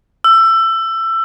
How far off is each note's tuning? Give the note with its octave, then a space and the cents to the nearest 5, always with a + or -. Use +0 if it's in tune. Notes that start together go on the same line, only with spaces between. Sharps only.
E6 +20